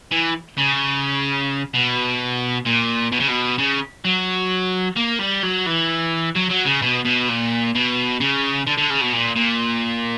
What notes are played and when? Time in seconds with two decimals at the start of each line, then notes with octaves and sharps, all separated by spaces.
0.11 E3
0.58 C#3
1.74 B2
2.65 A#2
3.12 B2
3.20 C#3
3.28 B2
3.58 C#3
4.05 F#3
4.97 A#3
5.20 G3
5.43 F#3
5.66 E3
6.36 F#3
6.51 F#3
6.66 C#3
6.82 B2
7.05 B2
7.28 A#2
7.75 B2
8.20 C#3
8.67 D3
8.78 D3
8.90 C#3
9.01 B2
9.13 A#2
9.36 A#2